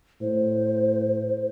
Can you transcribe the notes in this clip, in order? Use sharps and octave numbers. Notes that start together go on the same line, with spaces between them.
A2 C5